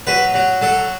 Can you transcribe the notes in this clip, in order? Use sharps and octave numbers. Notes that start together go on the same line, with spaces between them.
F#3 B4
F#3
F#3 A4